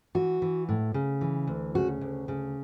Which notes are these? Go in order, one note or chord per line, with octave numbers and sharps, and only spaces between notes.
E3 F#4
E3
A2
C#3
E3
D2
C#3 F#4
D2
C#3